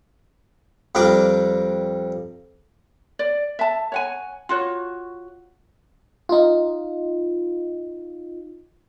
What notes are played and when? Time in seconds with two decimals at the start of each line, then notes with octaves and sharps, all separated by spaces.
0.95 F2 G3 D4 A#4 A#5 D6
3.19 D5
3.59 E5 A5
3.92 C#5 F#5 G#5
4.49 F4 F#4 C#5
6.29 D#4 F4